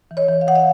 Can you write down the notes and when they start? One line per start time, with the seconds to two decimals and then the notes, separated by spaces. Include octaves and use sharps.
0.11 E3
0.17 C#5 D#5
0.29 E3
0.41 F5
0.47 E3 F#5
0.55 D#5 F5